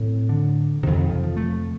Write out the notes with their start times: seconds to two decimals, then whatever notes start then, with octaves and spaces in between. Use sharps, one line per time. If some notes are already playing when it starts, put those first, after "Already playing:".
Already playing: A2 C4
0.29 D3
0.83 F2 C3 D#3
0.96 D#3
1.10 F3
1.24 F3
1.37 A3